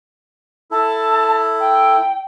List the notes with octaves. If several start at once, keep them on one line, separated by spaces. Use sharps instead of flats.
E4 A4 A5
G5